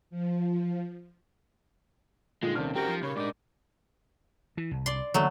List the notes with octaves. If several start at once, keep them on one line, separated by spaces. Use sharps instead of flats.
F3
A#2 D3 G3 G#3 D#4 A4
D#2 C3 C#4 D5 A5 F6
C4 F#4 G4 A#4 G5
F3
A#2 C#3 A#4 C#5 B5
G#2 D4 D#4 A#4 D5
E3
C2
D5 C6
D3 E3 F#3 A3 A#3